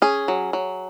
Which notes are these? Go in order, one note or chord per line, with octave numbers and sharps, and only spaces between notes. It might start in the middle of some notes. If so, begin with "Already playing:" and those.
C#4 G#4
F#3
F#3